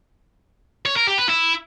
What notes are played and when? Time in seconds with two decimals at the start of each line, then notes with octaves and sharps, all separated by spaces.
0.86 C#5
0.97 A#4
1.07 G4
1.18 B4
1.29 E4